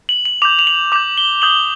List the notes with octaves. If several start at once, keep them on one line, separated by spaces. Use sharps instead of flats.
F#7
F#7
D6 G6 F7
F7
F#7
D6 G6 F7
G7
D#6 G6 F#7